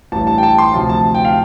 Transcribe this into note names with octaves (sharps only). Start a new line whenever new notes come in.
A1 G2 G3 A5
A5
G5
A5
C6
D2 C3 F3 A5
A5
G5
F5